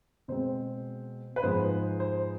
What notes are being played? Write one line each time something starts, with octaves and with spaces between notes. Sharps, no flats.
B2 G#3 C4 C5
B4
G#2 F3 G#3 B3 C5
C5